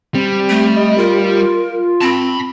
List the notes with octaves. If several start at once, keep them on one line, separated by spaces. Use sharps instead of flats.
G3 C4
A3
D#5
F4 A#4
C4 A5 B5